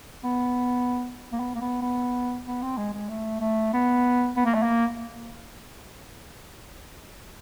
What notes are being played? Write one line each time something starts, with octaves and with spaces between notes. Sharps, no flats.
B3
A#3
B3
A#3
B3
B3
B3
C4
G#3
G#3
A3
A3
B3
B3
A#3
A3
A#3